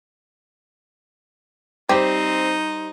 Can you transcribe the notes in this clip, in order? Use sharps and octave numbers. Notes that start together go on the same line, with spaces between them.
G3 C4 D#4 G4 C5